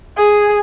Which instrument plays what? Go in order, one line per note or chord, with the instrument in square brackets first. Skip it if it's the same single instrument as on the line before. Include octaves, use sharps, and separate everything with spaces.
[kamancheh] G#4